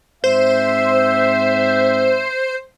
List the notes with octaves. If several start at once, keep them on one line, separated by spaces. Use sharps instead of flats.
G#2 C4 C5 E5